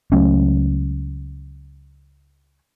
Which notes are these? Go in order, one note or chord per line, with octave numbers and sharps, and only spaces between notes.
C#2 F#3 A3 C#4